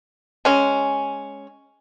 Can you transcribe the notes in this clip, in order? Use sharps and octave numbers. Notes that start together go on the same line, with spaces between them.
G#3 C#4